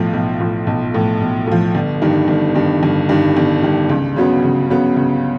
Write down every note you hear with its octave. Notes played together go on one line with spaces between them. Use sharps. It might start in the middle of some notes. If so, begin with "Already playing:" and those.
Already playing: B1 A2 F3
B1
A2 F3
B1
A2 F3
B1
A2 F3
G1
G2 D#3
G1
G2 D#3
G1
G2 D#3
G1
G2 D#3
C#2
C#3 F#3 B3
C#2
C#3 F#3 B3
C#2